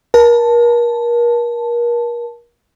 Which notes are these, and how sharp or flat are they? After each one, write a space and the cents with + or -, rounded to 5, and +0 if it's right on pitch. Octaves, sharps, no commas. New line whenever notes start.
A#4 +35 A5 +0